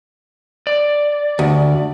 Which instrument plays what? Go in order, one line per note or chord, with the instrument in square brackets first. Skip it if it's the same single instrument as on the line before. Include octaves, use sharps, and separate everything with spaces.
[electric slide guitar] D5
[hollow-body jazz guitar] D2